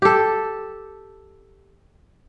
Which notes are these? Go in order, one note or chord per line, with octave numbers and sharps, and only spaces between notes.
G4 A4